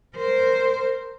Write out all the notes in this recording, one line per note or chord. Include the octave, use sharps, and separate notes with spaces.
A#4 C5